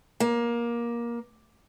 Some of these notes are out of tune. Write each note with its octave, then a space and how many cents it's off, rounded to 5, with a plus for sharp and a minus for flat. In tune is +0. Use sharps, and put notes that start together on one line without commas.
A#3 +20